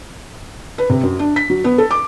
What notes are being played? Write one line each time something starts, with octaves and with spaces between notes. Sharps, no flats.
B4
C3
F#2
D4
B6
F#3
B3
A4
D6